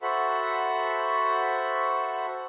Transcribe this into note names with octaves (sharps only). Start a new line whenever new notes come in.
F#4 A4 C5 E5 F#5 B5